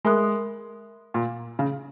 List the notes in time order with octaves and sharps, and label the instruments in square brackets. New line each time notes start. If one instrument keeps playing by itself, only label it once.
[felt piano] G#3 [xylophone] A#4 E5 B5 D#6 F#6
[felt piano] A#2
C#3